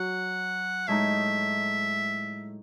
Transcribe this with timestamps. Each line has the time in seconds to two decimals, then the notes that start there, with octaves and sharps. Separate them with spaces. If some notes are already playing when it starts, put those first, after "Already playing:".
Already playing: F#3 F#4 F#5
0.88 A2 G#3 D#4 E5